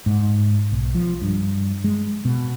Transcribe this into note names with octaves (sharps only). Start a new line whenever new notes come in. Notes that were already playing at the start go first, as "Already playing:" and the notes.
G#2
B1
F3
G2
G#3
B2